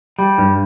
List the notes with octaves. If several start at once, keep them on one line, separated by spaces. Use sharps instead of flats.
G3
G2